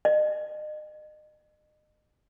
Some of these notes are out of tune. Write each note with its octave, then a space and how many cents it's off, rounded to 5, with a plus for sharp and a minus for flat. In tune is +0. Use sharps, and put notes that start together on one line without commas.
D#5 -35